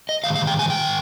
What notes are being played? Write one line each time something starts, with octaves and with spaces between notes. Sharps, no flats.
D#5
G#2 D#3 F5
F5
G5
G#5
G5